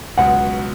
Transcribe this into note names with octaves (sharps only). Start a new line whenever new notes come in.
C#2 B2 F#3 F#5